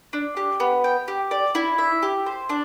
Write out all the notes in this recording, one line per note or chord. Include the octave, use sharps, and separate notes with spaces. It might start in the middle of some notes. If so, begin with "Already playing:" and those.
D4
G4
B3
G5
G4
D5
E4
E5
G4
C5
D4